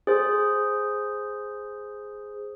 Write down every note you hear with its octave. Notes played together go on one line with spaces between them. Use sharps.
G#4 C5